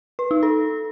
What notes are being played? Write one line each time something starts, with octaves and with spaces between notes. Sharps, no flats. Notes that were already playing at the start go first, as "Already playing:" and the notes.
B4
D#4
A4